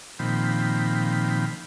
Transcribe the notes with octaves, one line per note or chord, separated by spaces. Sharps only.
A#2 D#3 F3 C4 G5 B5